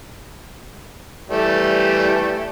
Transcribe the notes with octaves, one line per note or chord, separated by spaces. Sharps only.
E3 G3 A3